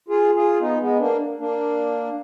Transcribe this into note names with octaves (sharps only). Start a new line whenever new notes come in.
F4 G#4
F4 G#4
B3 D#4
G#3 B3
A#3 D4
A#3 D4